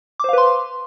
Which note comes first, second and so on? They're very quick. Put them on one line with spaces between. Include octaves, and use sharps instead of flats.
D6 C5 F5 B4 C6